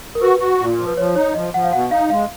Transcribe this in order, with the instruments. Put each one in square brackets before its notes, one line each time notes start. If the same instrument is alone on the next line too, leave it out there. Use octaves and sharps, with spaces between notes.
[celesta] A#4
[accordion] F#4 [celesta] B4
[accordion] F#4
A#2
F3
[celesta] B4
[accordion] F3 [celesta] C#5
[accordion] D#4 [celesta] C#5
[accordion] F3 [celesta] D#5
[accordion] F3 [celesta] F#5
[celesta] F5
[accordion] B2 [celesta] F#5
[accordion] D#4 [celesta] F5
[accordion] G#3 [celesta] F5